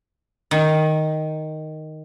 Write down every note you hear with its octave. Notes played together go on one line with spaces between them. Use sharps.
D#3